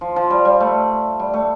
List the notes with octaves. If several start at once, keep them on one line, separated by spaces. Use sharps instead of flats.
F3
F3
G3
G3
A3
G3
A3